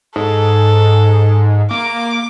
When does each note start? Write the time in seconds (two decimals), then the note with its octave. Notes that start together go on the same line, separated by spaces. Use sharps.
0.16 G#2 A4
1.71 A#3 D6